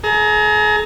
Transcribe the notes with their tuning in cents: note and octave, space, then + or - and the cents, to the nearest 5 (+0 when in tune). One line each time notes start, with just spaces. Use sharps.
G#4 +35 A#5 +0